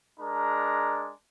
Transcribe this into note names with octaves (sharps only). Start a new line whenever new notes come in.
G#3 D4 A#4 A#5